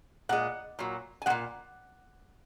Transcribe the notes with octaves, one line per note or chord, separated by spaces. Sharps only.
A#2 G#3 F#5
A#2 F#3
G#5
G#3 F#5
A#2